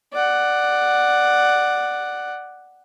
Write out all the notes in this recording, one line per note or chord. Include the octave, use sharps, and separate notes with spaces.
D5 F#5